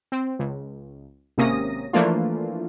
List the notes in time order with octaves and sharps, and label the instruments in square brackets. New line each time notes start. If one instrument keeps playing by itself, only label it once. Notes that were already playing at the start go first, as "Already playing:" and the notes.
[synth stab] C4
C#2
G#1 C3 A#3 C#4 D#6 A#6
E3 F3 A3 A#3 D4 F4